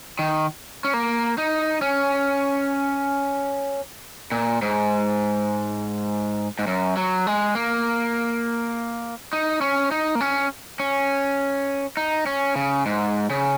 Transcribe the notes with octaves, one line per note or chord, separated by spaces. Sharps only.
D#3
C#4
A#3
D#4
C#4
A#2
G#2
G#2
F#2
F#3
G#3
A#3
D#4
C#4
D#4
A#3
C#4
C#4
D#4
C#4
C#3
G#2
C#3